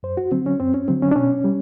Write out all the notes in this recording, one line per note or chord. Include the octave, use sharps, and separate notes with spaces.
F#2 C5
F#4
D3 F#3 C4
C#4
F#2 C4
C#4
D3 F#3 C4
C#4
D4
B2 C#4
G3